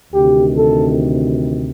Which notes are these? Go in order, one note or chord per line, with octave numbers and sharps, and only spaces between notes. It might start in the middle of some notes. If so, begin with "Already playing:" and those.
D2 C3 D#3 G4
A4